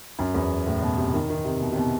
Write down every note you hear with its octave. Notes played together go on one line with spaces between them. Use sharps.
F#2
E2
A2
B2
C3
D#3
D#3
C3
B2
C3
B2